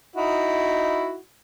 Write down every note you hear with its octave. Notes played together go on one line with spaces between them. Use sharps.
D#4 E4 F#4